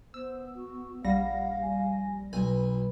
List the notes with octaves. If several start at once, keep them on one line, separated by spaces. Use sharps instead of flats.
B3 C5 E6
F#4
A#1 G3 F5 F#5 A#6
G#5
B1 F#4 B4 G#5